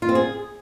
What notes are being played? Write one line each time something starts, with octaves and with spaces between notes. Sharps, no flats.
F4
C4
G#4